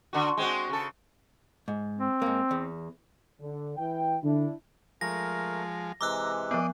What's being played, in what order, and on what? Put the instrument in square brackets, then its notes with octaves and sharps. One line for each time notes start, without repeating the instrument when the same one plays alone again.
[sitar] D3 F#4
G#3 C4 F#4
C#3 A4
[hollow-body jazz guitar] G#2
[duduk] C4
[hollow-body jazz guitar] G#2 A#3
E2
[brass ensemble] D3
E3 G5
[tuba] D3 [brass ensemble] D4 E4
[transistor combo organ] F3 G#3 [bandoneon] A3 A#4 [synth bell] A#6
[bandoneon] C3 E3 G#3 [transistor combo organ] A#5 [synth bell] D6 E6 F#6
[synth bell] F3 B3 [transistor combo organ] D5 D#5